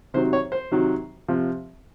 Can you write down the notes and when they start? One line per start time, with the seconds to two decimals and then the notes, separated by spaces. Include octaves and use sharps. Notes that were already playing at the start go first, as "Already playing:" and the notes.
0.14 C3 D#3 F#3 C5
0.33 C#5
0.52 C5
0.71 C3 D#3 F#3
1.28 C3 F3